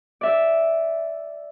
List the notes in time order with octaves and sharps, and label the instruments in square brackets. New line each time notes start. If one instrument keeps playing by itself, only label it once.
[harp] D5 E5